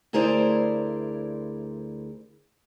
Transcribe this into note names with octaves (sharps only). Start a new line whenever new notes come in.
D2 E4 G#4 A#4 C5 D5